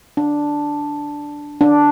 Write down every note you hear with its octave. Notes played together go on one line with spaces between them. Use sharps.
D4
D4